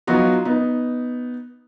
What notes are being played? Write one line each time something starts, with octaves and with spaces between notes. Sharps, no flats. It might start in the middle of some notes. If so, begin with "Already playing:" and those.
F#3 B3 D#4 F4 F#4
B3 D#4